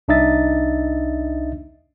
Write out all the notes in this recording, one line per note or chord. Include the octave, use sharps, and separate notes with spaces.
C2 D4 D#4 D#5 E5 A6